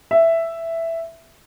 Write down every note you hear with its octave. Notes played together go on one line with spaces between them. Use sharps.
E5